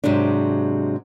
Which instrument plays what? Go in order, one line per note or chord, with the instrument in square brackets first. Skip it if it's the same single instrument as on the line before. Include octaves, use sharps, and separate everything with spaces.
[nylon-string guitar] G#2 C3 F#3 G#3 D4